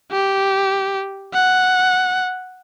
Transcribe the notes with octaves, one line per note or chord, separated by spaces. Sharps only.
G4
F#5